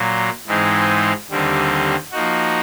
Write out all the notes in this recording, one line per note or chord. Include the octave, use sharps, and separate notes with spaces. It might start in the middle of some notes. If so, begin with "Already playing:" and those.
Already playing: A#2 F#3 A#3
G#2 E3 G#3 C4 D#4
D#2 D3 G3 C4 D#4
F3 A#3 D#4 F#4